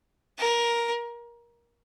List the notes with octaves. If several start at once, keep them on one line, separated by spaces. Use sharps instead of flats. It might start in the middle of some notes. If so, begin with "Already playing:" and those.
A#4